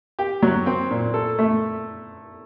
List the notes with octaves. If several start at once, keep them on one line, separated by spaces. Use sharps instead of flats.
G4
F#3
C4
A#2
A4
A3